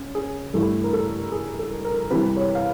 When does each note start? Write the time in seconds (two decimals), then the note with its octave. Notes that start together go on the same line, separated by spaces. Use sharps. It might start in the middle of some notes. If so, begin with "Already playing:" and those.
Already playing: C#3
0.15 G#4
0.54 G2 E3 A3 A4
0.84 A#4
0.93 A4
1.32 G#4
1.59 A4
1.85 A#4
2.11 C3 E3 G3 B4
2.37 C#5
2.55 F5